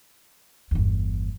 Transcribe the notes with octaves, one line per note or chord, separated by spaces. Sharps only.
G1 E2